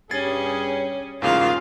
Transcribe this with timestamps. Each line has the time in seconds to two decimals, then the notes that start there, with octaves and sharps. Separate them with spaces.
0.11 G2 G3 C#4 G#4 G#6 A6 C7
1.22 E2 G#2 C#3 A#3 F4 G4 F5